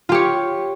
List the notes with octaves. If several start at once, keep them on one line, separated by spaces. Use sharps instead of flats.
F4 G4 C#5